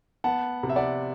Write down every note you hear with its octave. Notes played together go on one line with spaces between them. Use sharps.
B3 F#5 A5
C3
E5
D5 F#5